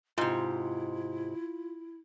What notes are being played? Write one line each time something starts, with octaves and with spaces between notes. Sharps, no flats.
G#2 C3 E4 F4